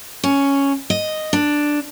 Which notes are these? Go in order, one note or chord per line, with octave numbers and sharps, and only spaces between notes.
C#4
D#5
D4